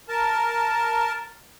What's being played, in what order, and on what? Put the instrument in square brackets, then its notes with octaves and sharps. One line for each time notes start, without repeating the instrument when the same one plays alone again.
[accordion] A#4 A5